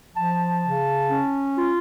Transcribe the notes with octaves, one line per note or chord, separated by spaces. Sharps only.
F3 A5
C#3
C#4
F4